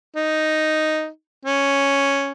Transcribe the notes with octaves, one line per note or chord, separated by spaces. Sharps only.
D#4
C#4